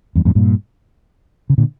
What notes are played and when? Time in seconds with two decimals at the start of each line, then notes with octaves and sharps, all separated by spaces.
0.15 E2 G2
0.25 F2 A2
0.35 G2 A#2
1.50 C#3
1.58 A#2 D3